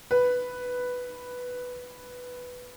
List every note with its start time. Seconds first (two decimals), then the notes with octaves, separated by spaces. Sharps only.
0.11 B4